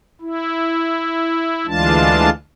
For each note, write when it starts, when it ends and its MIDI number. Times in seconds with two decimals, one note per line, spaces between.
0.21 1.66 64
1.67 2.30 38
1.67 2.30 52
1.67 2.30 56
1.67 2.30 62
1.67 2.30 65
1.67 2.30 81